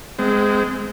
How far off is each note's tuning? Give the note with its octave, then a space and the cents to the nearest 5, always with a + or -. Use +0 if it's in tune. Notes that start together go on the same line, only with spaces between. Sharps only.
G#3 +0 C4 -35